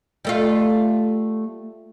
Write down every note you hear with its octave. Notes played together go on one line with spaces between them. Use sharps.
G3 A3 F4